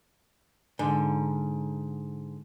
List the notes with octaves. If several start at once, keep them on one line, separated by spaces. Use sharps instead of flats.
G#2 D3